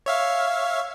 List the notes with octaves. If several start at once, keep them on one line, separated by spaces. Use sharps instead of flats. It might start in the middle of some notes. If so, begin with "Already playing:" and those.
C#5 E5 F5